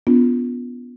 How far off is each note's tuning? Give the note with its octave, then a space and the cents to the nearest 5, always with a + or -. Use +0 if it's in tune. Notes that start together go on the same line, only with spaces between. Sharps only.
B3 +0 D4 -45 F4 +0